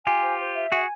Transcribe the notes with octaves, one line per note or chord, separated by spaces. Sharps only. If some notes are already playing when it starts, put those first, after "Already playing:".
F4 G4 G#5
C5
C5
E5
F#4 G#4 G#5